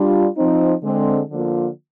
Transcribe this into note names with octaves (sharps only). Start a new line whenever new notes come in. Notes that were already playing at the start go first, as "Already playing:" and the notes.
Already playing: G3 D4 F4
F3 C4 D#4
D3 G#3 C4
D3 F3 A#3 F4